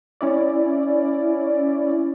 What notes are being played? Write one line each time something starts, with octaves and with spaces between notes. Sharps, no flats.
C#4 E4 D5